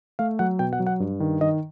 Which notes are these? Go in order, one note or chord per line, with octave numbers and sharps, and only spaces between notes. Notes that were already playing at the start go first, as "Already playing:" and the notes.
A3 F5
F#3 F#5
B2 G5
F#5
F#3
F#5
G2
D#3
D#3 D#5